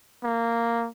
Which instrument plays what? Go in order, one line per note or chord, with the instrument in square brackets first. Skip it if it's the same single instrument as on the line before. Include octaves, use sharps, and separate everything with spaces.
[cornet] A#3